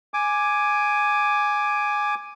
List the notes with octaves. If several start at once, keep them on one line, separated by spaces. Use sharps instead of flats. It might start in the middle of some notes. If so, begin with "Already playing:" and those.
G#5 D6